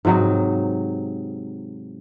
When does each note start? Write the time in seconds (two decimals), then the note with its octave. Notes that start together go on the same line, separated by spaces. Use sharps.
0.05 G#2 C3 F#3 D#4